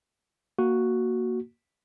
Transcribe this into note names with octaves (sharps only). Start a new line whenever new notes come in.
A#3 F#4